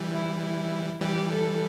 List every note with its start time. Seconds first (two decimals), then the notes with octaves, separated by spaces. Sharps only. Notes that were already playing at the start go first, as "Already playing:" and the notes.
Already playing: E3 G3
0.12 E4
0.41 E4
1.01 E3 G3 G4
1.31 A4